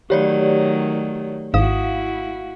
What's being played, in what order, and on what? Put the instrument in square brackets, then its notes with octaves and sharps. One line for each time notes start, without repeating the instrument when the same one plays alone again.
[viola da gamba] D#3 F#3 A3 [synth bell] G4 C#5 D5
[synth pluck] G#1 G#2 D#6 [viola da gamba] E4 F#4 [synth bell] F5